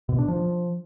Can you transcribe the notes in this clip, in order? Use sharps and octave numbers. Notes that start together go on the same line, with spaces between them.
B2
D4
F3